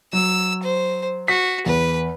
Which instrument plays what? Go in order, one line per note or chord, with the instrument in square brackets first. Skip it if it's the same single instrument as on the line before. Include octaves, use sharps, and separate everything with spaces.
[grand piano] F#3 [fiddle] E6
[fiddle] C5
[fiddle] F#4 [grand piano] B6
[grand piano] E2 [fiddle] B4